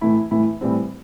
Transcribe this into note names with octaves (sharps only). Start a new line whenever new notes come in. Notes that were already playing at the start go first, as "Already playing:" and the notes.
A2 E3 A3 E4
A2 E3 A3 E4
A2 E3 G3 C4